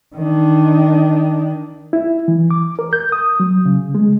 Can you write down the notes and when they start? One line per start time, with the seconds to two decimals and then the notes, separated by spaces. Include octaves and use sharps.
0.15 D#3 D4
1.93 E4
2.28 E3
2.51 D6
2.79 A#4
2.93 G6
3.12 D#6
3.40 F#3
3.66 C#3
3.95 G#3